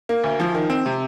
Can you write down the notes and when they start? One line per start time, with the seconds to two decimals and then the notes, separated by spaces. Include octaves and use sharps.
0.09 A#3
0.24 D2
0.40 F3
0.55 D#3
0.70 C4
0.86 C3